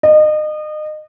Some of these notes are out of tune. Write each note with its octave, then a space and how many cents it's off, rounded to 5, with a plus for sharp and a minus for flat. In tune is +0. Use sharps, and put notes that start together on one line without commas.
D#5 -30